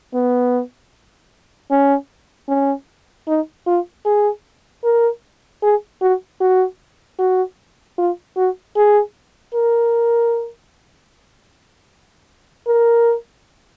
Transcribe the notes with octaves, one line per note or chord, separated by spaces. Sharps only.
B3
C#4
C#4
D#4
F4
G#4
A#4
G#4
F#4
F#4
F#4
F4
F#4
G#4
A#4
A#4